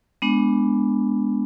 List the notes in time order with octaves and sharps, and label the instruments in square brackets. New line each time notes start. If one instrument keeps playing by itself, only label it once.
[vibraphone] G#3 B3 D4